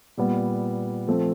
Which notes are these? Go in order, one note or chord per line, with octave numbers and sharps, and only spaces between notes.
A#2 G3 B3
F3 A3 C4